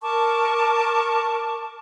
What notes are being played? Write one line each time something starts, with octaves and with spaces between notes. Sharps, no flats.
A#4 A5 C#6 D6